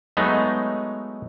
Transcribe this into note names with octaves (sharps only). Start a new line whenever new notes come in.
F#3 G#3 A3 B3 D#4